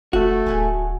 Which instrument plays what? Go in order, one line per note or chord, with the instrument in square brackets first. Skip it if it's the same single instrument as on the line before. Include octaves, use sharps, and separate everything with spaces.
[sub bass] E1 [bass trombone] A3 [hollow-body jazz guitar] F#4
[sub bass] D1 [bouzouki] G#4 F#5 G#5